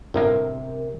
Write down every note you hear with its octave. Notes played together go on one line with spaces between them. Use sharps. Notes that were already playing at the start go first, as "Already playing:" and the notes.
G1 A2 C3 A#3 A#4